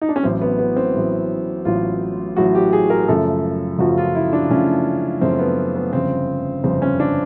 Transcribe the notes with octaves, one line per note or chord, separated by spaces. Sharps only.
D#4
D4
C#4
A1 A2 F#3 C4
B3
B3
C4
A1 A2 F#3
A1 A2 F#3 F4
A1 A2 F#3 F#4
G4
G#4
A#4
F#2 C#3 F3 A3 A4
F#2 C#3 F3 A3 F#4
F4
E4
D4
F#2 C#3 F3 A3 C#4
F#2 C#3 F3 A3 C4
B3
B3
G1 F2 C#3 C4
G1 F2 C#3 C4
C#4
D4